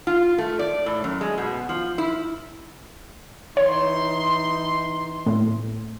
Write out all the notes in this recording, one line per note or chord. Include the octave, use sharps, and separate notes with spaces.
F4
A3
D5
A2
F#2
G#3
B2
F3
E4
E3 D#4 C#5 C6
A2